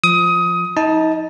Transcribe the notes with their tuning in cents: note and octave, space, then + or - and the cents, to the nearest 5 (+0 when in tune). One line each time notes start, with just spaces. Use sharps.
F3 +0 D#6 +20
D#4 +35 D#5 -10 A5 +0